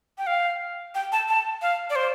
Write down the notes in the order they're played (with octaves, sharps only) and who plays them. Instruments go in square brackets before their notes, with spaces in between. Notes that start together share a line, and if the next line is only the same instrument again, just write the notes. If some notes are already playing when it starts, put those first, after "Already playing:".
[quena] G5
F5
G5
A5
A5
F5
D5
C5